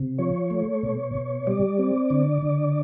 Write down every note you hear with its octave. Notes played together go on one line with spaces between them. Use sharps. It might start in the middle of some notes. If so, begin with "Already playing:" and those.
Already playing: C3
F3 C#5
A3
B2
B2
G3 D5
C4
D3
D3